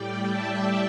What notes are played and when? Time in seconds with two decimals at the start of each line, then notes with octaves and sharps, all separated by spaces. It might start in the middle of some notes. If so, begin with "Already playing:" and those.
Already playing: A2 G3 D5 G5
0.22 E5 A5